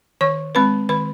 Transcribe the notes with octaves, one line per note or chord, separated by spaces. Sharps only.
D#3 C#5 C#6
G#3 C4 B4 B5
D#3 B4 B5